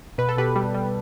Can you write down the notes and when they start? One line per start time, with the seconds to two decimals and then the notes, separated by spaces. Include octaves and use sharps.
0.18 B2 B4
0.29 A4
0.37 B2 G4 B4
0.56 G3
0.75 G3